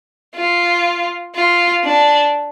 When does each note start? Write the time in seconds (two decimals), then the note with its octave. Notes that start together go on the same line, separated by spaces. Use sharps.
0.36 F4
1.36 F4
1.84 D4